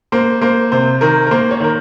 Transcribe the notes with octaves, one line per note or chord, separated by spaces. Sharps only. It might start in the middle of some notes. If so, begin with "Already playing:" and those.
A#3 C5
A#3 C5
C3 C5
D#3 A#4
A#4
A#3 C5
C#5
D#3 A#4